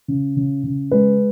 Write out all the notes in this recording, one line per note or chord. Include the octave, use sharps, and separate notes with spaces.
C#3
C#3
C#3
G#3 B4